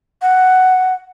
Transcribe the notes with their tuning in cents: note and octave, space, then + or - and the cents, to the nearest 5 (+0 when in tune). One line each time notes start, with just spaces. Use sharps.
F#5 +5